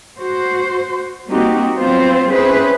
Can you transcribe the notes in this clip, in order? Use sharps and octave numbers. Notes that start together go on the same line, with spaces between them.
F#4 C5
G3 A#3 C4 D#4 F#4 G4
F#3 B3 C4 F4 C5
C4 C#4 E4 G#4 B4 C5